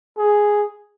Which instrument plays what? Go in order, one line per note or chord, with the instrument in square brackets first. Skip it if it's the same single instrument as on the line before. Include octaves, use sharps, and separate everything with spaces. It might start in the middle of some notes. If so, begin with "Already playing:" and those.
[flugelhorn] G#4